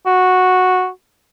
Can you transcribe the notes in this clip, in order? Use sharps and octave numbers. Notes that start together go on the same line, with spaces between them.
F#4